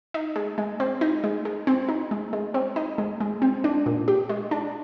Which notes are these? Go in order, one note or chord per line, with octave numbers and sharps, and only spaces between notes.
D#4
G#3
G#3
C4
D#4
G#3
G#3
C4
D#4
G#3
G#3
C4
D#4
G#3
G#3
C4
D4
A#2
G4
G#3
D4